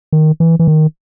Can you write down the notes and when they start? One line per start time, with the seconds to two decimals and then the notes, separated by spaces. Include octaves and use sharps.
0.13 D#3
0.40 E3
0.59 E3
0.68 D#3